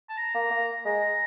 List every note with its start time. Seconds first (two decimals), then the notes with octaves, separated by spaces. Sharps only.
0.09 A5
0.17 A#5
0.35 A#3
0.51 A#3
0.85 G#3 A#5